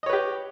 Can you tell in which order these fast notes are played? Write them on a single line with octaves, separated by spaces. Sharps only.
D#5 C#5 B4 G4